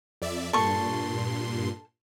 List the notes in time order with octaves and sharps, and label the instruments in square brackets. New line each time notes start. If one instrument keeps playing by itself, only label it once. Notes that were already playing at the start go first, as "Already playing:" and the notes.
[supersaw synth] F2 D5 E5
[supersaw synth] G2 A#2 C6 [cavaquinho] A4 C#6